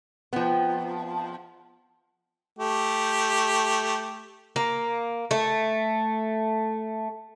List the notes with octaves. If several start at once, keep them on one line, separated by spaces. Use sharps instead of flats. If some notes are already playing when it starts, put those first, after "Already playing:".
F3 B3 C4 D#5 G5
A3 G4
A#3
A3